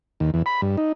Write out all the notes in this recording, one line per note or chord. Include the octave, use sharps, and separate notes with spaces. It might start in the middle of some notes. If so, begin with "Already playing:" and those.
D#2
E2
B5
G2
D#4